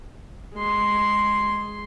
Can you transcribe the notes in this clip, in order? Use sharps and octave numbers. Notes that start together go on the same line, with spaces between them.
G#3 C6